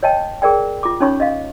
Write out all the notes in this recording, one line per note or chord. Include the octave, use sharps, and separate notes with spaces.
C#5 D#5 G5 A5
G#4 A#4 D5 G5
F4 D6
C#4 D#4 C#5 B5 C#6
D#5 F5